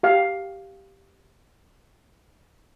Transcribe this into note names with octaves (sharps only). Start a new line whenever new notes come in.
G4 F5